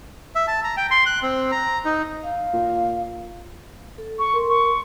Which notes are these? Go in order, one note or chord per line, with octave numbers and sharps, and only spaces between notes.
E5
A5
A#5
G5
C6
F#6
C4
A#5
D#4
F5
A#2
A4
C#6
A#4 C6
C#6